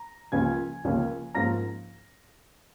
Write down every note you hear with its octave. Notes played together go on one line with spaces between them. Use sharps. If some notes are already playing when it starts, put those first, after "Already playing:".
Already playing: A#5
C#2 C#3 F3 A#3 C#4 G#5 G#6
C#2 C#3 F3 A#3 C#4
G#2 F3 A#3 C#4 A#5 A#6